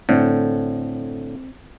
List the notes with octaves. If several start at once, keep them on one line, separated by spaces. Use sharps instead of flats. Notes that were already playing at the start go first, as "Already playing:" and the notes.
A2 D3 C4